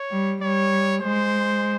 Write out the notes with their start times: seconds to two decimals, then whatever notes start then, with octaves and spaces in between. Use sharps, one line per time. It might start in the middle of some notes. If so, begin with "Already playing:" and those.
Already playing: C#5
0.11 G3
0.42 G3 C#5
1.02 G#3 C5